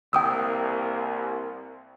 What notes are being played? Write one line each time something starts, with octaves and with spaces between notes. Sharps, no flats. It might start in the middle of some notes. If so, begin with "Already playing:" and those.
C2 A#3 G5 D#6 E6